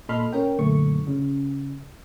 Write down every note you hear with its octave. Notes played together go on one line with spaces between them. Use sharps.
A#2 A4 D#5 B5 C6 F6
C#4 A#4 C#5 G5
F#2 A#2 D3 A3 C#6
C#3